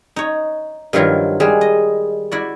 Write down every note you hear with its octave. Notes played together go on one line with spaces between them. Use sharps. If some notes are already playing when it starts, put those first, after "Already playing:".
D#4 C#5
G2 D#3 F3 F#3 E4 F4
G3 G#3 G#4
D#5
E4 F#4 D5